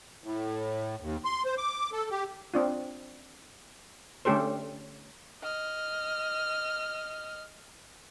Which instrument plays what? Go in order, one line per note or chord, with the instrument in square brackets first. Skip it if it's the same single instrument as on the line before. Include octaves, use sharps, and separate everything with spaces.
[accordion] A2
D#2
C6
C5
D6
A4
G4
[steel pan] C4 D4 F4
D3 A3 C#4 G4 A4 C5
[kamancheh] D#5 F6